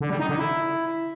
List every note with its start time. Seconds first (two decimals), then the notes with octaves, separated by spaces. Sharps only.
0.01 D3
0.10 G3
0.20 D#4
0.29 D3
0.39 E4